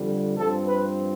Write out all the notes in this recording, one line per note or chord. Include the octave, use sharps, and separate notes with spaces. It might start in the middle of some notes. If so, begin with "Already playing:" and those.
Already playing: F2 D3 G3
G2 F3 C4 A4
B4